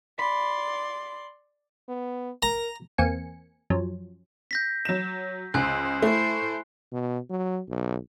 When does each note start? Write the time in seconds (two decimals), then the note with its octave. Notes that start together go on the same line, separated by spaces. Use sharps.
0.19 D5 B5 C6
1.89 B3
2.43 A#4 A#5
2.98 E2 A#3 C4 G#5 C#7
3.70 F#2 F3 F#3 C#4
4.51 G6 A#6 B6
4.85 F#3 E7
5.54 C#2 C5 G#5 F#6
6.02 A3 E4 C5
6.92 B2
7.30 F#3
7.69 B1